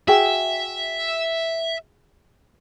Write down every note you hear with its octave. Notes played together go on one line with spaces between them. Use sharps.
F#4 G#4 E5 G5